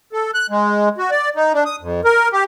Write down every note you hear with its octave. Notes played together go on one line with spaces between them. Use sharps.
A4
F#6
G#3
F#4
D5
D#4
D4
D#6
F2
A#4
G4